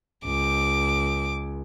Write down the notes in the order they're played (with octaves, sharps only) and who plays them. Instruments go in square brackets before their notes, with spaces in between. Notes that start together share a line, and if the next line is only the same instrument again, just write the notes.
[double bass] C#2 [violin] D6